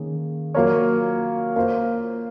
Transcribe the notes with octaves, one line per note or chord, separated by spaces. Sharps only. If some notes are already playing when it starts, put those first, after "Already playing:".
Already playing: D#3 A#3 C#4 G#4
F#3 A#3 F4 A#4 C#5
A#3 F4 C5